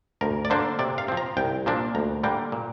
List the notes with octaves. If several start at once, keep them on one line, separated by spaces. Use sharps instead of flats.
D2 A#4
D5
D3 A#3 D4 C5
C3 D5
F5
F3 C4
A#5
C2 G5
A#2 F3 A#3 D4
D2 A#5
D3 G3 A#3 G5
A#2